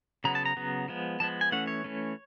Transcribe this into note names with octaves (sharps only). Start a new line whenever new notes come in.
C#3 F#3 B3 A#5
A5
A#5
C#3 F#3 B3
F3 G#3 B3
F3 G#3 B3 A5
G#5
E3 A3 C#4 F#5
C#5
E3 A3 C#4